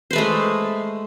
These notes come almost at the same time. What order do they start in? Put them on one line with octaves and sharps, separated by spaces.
C5 B4 A3 G#3